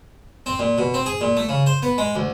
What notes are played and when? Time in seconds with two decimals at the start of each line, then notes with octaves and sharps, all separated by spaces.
0.46 C4
0.59 A#2
0.78 B2
0.94 C4
1.06 G#4
1.21 A#2
1.37 A3
1.49 C#3
1.66 C5
1.82 B3
1.98 G#3
2.15 D2